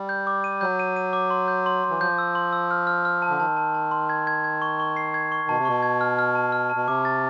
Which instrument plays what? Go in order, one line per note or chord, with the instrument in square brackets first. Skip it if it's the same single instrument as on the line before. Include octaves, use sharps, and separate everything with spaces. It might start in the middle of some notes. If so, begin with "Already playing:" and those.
Already playing: [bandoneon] G3
[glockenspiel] G6
D6
D#7
[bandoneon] F#3 [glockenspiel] G6
[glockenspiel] D#7
D#7
D6
C6
G6
C6
C6
[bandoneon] E3
[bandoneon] F3 [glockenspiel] G6
[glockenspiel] E6
C6
E6
F6
F6
F6
A5
[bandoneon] D3
[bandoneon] D#3 [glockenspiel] A5
[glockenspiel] A5
A5
C6
G#6
G#6
G#6
C#6
C#6
C7
G#6
C#6
[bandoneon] B2 [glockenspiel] A5
[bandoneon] C3
[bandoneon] B2 [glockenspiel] C#6
[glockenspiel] G#6
F6
F6
A5
F6
A5
[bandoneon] B2
[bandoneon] C3 [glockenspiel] D6
[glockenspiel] A6